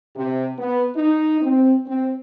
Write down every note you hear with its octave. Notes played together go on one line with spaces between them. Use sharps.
C3
B3
D#4
C4
C4